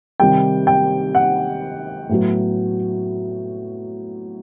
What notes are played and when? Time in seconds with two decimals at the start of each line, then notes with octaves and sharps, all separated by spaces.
0.20 C3 D#3 G3 G5
0.67 G5
1.15 F#5
2.09 A2 F#3 B3